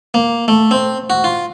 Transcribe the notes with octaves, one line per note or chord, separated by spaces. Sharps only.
A#3
A3
C4
F#4
F4